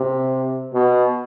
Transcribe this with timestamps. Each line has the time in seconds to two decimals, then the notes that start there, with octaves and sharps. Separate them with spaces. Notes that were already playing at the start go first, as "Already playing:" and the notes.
Already playing: C3
0.73 B2